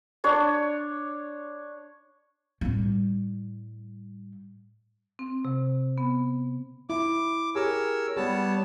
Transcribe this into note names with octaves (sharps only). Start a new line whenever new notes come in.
D4 C#5 C6
A2 G3
C4
C3
B3
E4 D6
G4 G#4 A#4 C#5 E6
G3 B3 G4 C#5 A5